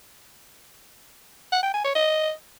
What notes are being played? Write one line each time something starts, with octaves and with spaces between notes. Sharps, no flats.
F#5
G5
G#5
C#5
D#5